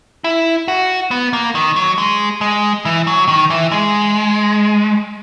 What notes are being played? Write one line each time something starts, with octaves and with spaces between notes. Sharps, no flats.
E4
F#4
B3
A#3
D#3
F#3
G#3
G#3
E3
F#3
D#3
E3
G#3